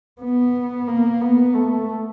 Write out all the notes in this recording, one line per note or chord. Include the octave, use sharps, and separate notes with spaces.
B3
A#3
B3
A3